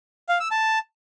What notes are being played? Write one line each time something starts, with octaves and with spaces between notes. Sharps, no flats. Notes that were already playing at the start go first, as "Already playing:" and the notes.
F5
E6
A5